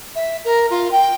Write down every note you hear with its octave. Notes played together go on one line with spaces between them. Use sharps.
E5
A#4
F4
G5